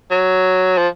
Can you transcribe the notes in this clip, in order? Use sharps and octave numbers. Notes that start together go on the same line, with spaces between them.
F#3
F3